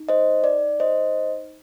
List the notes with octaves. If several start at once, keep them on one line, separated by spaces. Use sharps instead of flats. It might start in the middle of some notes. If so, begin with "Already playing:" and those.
Already playing: D#4
C5 D#5
D5
C5 D#5